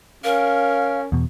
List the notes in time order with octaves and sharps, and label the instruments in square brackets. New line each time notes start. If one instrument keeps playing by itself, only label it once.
[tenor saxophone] C#4 [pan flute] A#4 [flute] F5
[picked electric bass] E2 B2